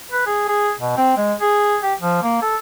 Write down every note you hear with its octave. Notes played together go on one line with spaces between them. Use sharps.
B4
G#4
G#4
B2
C4
G#3
G#4
G4
F3
A#3
A4